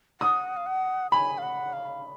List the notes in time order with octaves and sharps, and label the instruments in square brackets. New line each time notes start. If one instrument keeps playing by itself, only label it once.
[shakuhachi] F#5 [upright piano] D#6
[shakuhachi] F5
F#5
[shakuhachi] G#5 [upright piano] B5
[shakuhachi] F5
F#5
F5